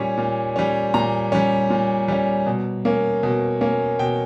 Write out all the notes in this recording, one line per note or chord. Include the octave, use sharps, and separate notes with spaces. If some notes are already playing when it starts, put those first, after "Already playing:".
Already playing: A#2 G3 C#4 C#5
A#2
G3 C#4
A#2 A#5
G3 C#4
A#2
G3 C#4
B2
A#3 C#4
B2
A#3 C#4
B2 G5